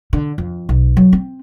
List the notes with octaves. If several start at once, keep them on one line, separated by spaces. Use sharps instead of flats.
D3
F2
B1
F#3
C4